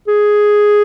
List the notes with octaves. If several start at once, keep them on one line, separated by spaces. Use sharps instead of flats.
G#4